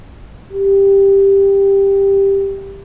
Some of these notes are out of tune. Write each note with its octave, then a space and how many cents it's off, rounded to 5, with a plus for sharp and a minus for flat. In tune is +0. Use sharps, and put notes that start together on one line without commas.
G4 +5